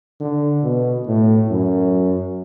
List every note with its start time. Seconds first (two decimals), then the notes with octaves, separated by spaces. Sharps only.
0.20 D3
0.63 B2
1.07 A2
1.50 F#2